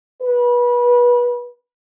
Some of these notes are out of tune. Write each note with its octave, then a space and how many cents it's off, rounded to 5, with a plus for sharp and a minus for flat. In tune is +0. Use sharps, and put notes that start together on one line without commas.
B4 -25